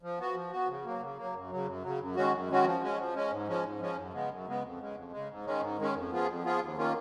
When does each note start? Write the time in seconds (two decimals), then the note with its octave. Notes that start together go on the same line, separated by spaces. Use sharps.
0.02 F3
0.19 B3 F#4
0.35 F3
0.52 B3 F#4
0.68 C#3
0.85 F#3 A#3
1.01 C#3
1.17 F#3 A#3
1.34 F#2
1.50 C#3 F#3
1.66 F#2
1.83 C#3 F#3
2.00 F#2
2.16 D#3 G#3 C#4 F#4
2.33 F#2
2.49 D#3 G#3 C#4 F#4
2.65 F3
2.82 G#3 C#4
2.98 F3
3.15 G#3 C#4
3.31 G#2
3.48 F3 G#3 C#4
3.64 G#2
3.80 F3 G#3 C#4
3.96 F#2
4.13 C#3 G#3 B3
4.29 F#2
4.46 C#3 G#3 B3
4.63 F2
4.79 C#3 G#3
4.95 F2
5.11 C#3 G#3
5.29 G#2
5.45 D#3 G#3 C#4
5.61 G#2
5.78 D#3 G#3 C#4
5.95 F2
6.11 F3 B3 F4 G#4
6.27 F2
6.43 F3 B3 F4 G#4
6.60 D#2
6.76 D#3 A#3 C#4 F4